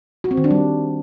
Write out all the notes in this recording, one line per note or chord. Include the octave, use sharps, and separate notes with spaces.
F#4
C4
D#3
D4
G3